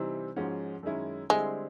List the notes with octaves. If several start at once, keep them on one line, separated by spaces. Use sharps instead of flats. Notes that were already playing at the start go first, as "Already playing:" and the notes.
Already playing: C3 E3 G3 C4 D#4
G#2 F3 G#3 C#4 F#4
F#2 D#3 G#3 C#4 E4
D3 G3 G#3 C4 E4